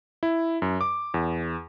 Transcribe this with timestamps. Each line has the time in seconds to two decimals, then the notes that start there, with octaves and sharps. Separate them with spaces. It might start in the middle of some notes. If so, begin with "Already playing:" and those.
0.23 E4
0.62 F#2
0.81 D6
1.14 E2